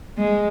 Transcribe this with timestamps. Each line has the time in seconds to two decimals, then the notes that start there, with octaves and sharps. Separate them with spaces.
0.18 G#3